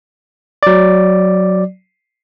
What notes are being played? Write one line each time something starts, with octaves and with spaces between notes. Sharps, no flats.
F#3 D5